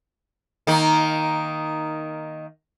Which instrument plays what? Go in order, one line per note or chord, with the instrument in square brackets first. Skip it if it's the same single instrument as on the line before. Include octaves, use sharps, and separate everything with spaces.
[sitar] D#3 A#3